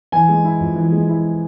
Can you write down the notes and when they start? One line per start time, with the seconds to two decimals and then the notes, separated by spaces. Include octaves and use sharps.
0.12 E3 G#5
0.29 G#3
0.45 E4
0.60 F2
0.76 E3
0.92 G#3
1.09 E4